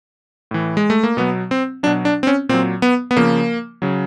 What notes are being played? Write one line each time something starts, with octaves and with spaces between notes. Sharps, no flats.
A2 E3
G#3
A3
A#3
B2 F#3 B3
C4
B2 F#3 D4
D4
C4
C#4
A#2 F#3 C4
B3
B3
C#3 F3 A#3
C#3 F#3